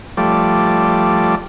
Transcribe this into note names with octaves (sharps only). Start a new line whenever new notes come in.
F3 G3 A3 D5